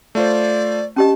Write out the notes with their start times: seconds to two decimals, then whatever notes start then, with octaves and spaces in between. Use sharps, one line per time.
0.15 A3 F4 C5 D5
0.96 C#4 G4 D#5 A5